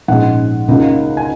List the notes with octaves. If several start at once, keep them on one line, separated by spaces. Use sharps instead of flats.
A#1 G#2 G#3 C#4 F#5
C#2 C#3 A#3 D#4
G#5